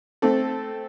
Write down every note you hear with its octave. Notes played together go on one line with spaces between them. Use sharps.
A3 C4 A4